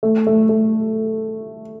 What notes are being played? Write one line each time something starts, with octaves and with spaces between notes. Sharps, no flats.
A3
A3
A3